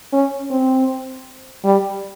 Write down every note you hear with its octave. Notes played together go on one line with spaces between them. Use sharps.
C#4
C4
G3